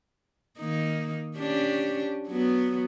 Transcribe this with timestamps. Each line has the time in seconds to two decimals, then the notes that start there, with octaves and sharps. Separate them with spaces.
0.59 D#3 A#3 D#4
1.37 C#4 D4 G4
2.27 F#3 B3